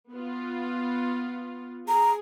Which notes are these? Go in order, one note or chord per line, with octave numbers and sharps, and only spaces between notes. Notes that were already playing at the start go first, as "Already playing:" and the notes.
B3 F4
G#4 A#5